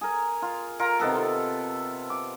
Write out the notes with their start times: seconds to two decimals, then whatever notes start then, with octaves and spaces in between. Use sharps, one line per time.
0.01 G#4 A#4
0.42 F4
0.79 F4 A#4 A#5
1.00 C3 D#3 B3 A4
1.16 F4
2.10 D6